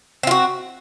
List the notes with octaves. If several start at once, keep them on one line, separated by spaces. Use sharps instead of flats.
C4 F4 F#4